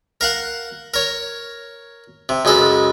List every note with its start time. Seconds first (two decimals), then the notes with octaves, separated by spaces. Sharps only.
0.21 A#4 F5 F#5
0.94 A#4 C#5
2.29 C3
2.45 C#2 F#2 G#3 A4